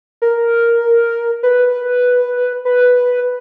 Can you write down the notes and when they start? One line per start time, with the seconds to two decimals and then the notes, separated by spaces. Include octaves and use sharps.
0.22 A#4
1.43 B4
2.65 B4